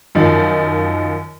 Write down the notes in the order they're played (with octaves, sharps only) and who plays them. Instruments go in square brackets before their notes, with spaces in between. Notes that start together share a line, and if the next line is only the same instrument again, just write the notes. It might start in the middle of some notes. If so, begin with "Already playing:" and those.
[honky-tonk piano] F#2 D#3 F3